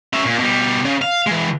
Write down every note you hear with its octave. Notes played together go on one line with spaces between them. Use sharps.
C#4 E5
A#2
B2 G3
C#3
F5
E3 G#3